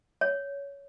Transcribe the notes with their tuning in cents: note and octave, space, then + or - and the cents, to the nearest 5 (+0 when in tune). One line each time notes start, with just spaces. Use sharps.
C#5 +15